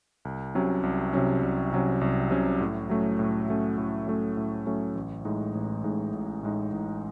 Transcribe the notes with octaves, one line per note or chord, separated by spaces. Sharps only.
C2
C3 F#3 C#4
C2
C3 F#3 C#4
C2
C3 F#3 C#4
C2
C3 F#3 C#4
A2
F#3 A3 C#4
A2
F#3 A3 C#4
A2
F#3 A3 C#4
A2
F#3 A3 C#4
A1
A2 G#3 D#4
A1
A2 G#3 D#4
A1
A2 G#3 D#4
A1